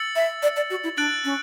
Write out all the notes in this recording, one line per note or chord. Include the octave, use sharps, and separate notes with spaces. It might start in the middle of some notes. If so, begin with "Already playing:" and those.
Already playing: E6 A6 C#7 F#7
E5
D5
D5
F#4
E4
D4 F#6 A6 D7 F#7
C#4